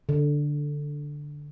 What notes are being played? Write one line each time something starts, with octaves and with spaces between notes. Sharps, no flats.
D3